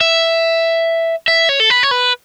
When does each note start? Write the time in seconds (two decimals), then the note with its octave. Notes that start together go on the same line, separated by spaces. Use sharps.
0.01 E5
1.28 E5
1.49 C#5
1.60 A4
1.70 B4
1.83 C#5
1.91 B4